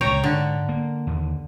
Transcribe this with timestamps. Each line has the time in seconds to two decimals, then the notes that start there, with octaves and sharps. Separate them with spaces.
0.01 C#2 A#2 C#5 G5 A#5
0.24 G#2 D3
0.69 A#3
1.07 D#2